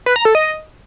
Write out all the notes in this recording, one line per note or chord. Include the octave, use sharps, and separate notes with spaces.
B4
A#5
A4
D#5